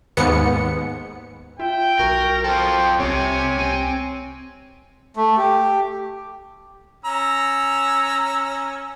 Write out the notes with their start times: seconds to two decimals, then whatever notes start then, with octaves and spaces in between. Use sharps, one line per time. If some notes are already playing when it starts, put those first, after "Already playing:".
0.17 D#2 G#2 B3 C#7
1.60 F4 E5 G5
1.99 B1 F#4 A#4
2.44 F4 A4 C5 G5
3.00 C2 C4 G4 C#5 G#5
3.59 C4
5.16 A3
5.37 G4
7.05 C#4 A#5 E6